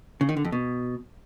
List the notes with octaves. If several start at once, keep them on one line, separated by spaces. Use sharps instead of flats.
C#3
D#3
D3
F2
B2